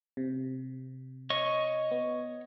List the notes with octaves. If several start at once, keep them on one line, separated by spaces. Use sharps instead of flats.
C3
C#5 D#5 C#6
B3